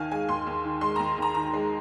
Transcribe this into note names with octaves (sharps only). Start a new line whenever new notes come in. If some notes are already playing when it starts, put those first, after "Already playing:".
Already playing: D#2 D#3 F5 G#5
G#3 G#5
D#2 C6
D#2
D#3
G#3 C6
D#2 A#5
D#2 A#5
D#3 A#5
G#3